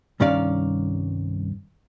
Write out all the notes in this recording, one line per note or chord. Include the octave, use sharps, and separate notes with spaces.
C2 G2 D#3 C#4 D5 F5